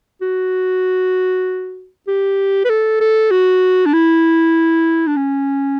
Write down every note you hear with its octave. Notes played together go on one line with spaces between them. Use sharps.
F#4
G4
B4
A4
A4
F#4
D4
E4
D4
C#4